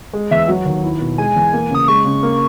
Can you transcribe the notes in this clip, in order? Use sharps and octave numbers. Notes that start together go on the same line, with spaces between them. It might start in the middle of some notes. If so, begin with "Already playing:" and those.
G#3
E2 E5
F#3
D#2
E4
B2
G#3 G#5
E2
A#3
C#3 D#6
G#3 C#6
C#3
A#3